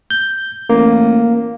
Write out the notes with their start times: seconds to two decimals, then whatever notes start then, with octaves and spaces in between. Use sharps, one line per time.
0.10 G6
0.69 A1 A#3